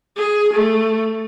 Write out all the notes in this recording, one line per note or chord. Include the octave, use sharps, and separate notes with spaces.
G#4
A3